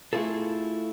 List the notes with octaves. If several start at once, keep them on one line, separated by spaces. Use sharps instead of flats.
A3 E4 F4 G#4 A4